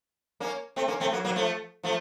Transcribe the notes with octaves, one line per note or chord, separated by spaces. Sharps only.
A#3 C#4
A3 C4
A#3 C#4
A3 C4
F#3 A#3
F#3 A#3
F3 A3
F3 A3